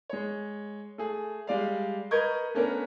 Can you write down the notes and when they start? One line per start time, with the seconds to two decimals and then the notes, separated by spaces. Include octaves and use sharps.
0.10 G#3 C#5
0.98 A3 G#4
1.47 G3 G#3 D5 F5
2.11 A#4 B4 D#5 C#6 G6 G#6
2.54 A3 B3 C#4 D4 A#4